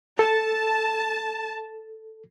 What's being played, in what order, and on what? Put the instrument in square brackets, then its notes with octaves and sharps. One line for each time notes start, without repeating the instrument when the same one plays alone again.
[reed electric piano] A4 [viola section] A5